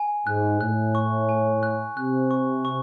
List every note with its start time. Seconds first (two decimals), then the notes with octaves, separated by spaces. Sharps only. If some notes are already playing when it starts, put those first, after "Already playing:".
Already playing: G#5
0.27 G#2 F#6
0.61 A2 F#6
0.95 C#6
1.29 G#5
1.63 F#6
1.97 C3 F#6
2.31 C#6
2.65 C#6